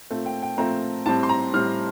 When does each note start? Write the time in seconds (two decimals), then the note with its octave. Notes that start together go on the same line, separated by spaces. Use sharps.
0.10 A#2 A3 C4
0.26 G5
0.42 G5
0.58 A#2 A3 C4 A#5
1.06 A2 G3 C4 A5
1.23 C6
1.29 A#5
1.53 A2 G3 C4 F6